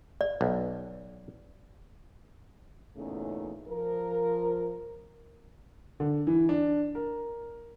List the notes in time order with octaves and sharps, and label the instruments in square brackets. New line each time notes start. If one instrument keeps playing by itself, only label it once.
[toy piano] D5
[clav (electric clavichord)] B1
[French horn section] E2 A#2 C#3 A3 C#4 D#4
F3 A#4
[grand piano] D3
E3
D4
A#4